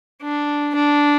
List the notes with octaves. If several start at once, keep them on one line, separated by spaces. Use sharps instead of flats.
D4
D4